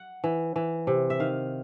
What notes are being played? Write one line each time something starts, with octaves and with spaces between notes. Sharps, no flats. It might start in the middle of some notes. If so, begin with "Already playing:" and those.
Already playing: F#5
E3
E3
C3
E5
D#3 F5